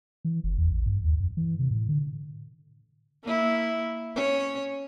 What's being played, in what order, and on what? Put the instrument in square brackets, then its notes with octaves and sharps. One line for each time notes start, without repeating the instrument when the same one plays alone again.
[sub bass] E3
F#1
E2
A1
G2
D#2
F#2
E3
C3
A2
D3
[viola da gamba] A#3 E4
C#4 C#5